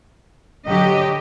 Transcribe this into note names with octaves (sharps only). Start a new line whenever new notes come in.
D3 F#3 G4 D#5